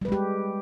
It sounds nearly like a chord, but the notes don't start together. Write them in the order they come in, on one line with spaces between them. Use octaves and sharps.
G3 B4 G#3 G4